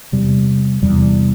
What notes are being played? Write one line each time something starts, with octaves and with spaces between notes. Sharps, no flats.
E2 C3 G3
E2 C3 G3